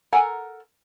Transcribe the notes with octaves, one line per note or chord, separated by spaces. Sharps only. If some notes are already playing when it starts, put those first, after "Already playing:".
A4 A#4 F#5 G#5 A#5